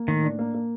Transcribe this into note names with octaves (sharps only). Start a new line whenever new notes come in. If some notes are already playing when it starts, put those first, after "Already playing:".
Already playing: A#3
A2 D#3
D4
A#3
A#3